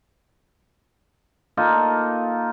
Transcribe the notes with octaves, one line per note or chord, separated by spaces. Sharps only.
A#3 D#4 F4 A4